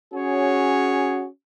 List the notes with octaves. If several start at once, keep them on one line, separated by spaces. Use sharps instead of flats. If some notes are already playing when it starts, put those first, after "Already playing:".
C#4 F#4 G#4 C#5